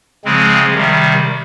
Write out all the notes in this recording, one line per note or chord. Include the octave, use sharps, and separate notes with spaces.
C#3 F3 G#3 C4
C3 D#3 G3